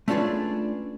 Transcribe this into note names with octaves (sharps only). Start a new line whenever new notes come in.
A3 C#4 D4 F4 G#4 B4